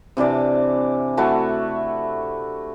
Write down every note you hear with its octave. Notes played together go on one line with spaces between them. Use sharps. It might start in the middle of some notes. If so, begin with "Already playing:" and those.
C3 E3 D4 D5
A3 E4 F#4 A5